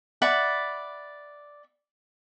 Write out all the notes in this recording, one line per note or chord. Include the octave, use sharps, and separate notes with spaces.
D5 E5 F#5 B5